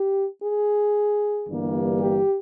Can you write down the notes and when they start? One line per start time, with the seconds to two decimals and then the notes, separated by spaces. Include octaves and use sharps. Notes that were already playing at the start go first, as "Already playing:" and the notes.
Already playing: G4
0.42 G#4
1.47 G1 G2 E3 G3 A#3
2.00 G4